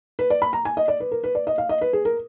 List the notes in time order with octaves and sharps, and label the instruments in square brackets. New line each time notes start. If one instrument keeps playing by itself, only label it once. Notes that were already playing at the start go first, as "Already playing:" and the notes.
[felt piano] B4
D5
B5
A#5
G#5
D#5
D5
B4
A#4
B4
D5
D#5
F5
D#5
B4
G#4
A#4